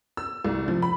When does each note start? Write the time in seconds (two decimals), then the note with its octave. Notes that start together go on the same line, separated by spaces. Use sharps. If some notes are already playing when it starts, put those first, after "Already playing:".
0.17 E6
0.45 C2
0.68 F3
0.82 B5